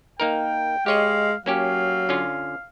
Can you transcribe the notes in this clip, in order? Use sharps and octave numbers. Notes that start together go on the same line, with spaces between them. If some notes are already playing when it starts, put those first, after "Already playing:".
A#3 D#4 A#4 G5
G#3 G4 C#5 D#5 F5
F#3 A#3 C#4 G4 F5
D3 C#4 F4